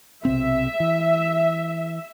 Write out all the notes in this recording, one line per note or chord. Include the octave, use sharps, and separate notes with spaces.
B1 C3 C4 E5
E3